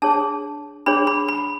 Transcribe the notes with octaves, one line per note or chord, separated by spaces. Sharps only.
D4 G#4 C#5 A5
D4 G#4 C#5 B5
B5
B5